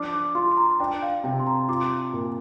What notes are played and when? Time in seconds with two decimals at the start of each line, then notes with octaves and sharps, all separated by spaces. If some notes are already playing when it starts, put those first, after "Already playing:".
Already playing: F3 D4 D6 F6
0.13 D6
0.35 F4 C6
0.51 C6
0.57 A#5
0.80 D4 G5
1.03 F5
1.24 C3 G5
1.39 C6
1.47 A#5
1.69 F4 D6
2.13 A#2